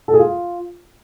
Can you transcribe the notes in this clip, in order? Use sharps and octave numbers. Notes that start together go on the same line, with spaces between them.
A4
G#4
F4